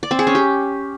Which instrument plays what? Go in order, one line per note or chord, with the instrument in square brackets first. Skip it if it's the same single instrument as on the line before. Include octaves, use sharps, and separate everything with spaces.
[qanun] D5
C4
G#4
C#4
G4